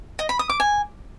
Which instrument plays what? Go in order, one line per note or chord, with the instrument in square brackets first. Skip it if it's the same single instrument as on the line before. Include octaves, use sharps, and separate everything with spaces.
[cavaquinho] D#5
B5
D#6
D6
G#5